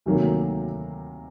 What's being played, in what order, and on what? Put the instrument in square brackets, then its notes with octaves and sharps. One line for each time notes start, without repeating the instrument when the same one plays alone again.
[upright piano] D2 C3 D#3 F#3 A#3